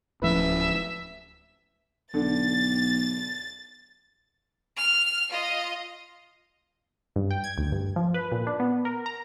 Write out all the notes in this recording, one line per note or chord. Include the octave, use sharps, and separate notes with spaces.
D1 F3 A3 C#4 E4 B4 E5
B1 D3 A6
F6
F4 D#5
G2
G5
G#6
D2
G2
F3
B4
A#2
D4
B3
A#4
A#5